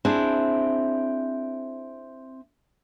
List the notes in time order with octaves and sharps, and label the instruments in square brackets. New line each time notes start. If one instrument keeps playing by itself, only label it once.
[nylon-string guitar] C4 D4 E4 G#4